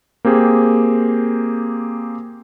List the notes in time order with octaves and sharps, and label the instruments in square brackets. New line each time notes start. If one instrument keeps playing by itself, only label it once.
[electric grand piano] A#3 C4 G4 G#4